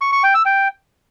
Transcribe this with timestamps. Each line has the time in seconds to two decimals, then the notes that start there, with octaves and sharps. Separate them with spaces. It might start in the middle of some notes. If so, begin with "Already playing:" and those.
0.01 C#6
0.12 C#6
0.23 G5
0.34 E6
0.45 G5